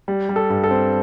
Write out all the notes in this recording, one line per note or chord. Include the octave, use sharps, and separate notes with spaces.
G3
G3
A4
G2
A4
C4